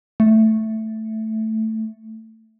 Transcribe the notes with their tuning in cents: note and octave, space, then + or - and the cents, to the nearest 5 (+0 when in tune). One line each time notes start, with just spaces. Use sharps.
A3 +0